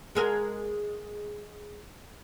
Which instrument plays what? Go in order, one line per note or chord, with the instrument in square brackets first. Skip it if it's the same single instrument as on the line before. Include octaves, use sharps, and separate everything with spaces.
[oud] G#3 G#4 A#4